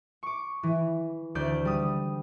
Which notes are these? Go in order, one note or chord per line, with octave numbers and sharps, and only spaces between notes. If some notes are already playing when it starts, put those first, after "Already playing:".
C#6 D6
E3
D2 D5 G6
G3 D#6